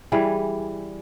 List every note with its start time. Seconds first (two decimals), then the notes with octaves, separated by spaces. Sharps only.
0.12 E3 G3 G#4